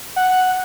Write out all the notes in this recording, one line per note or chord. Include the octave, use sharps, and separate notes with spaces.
F#5